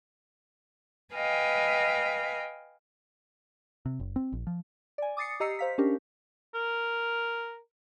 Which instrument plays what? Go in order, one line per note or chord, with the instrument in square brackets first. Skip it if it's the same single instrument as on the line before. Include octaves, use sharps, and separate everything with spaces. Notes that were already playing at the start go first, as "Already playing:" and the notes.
[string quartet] B4 D#5 F5 G5 G#5
[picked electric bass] C3
F#1
C4
A#1
F3
[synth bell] D5 G#5
D6 D#6 A6 C7 C#7
G4 D#5 A#5 E6 C7 C#7
C5 F5 B6
C#4 D4 G4 A#4
[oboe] A#4